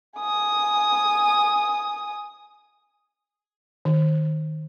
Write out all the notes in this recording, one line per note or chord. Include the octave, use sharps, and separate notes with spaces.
G#5 D#6
D#3